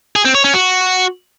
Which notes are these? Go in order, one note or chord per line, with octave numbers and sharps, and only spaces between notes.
G#4
C4
C#5
C#4
F#4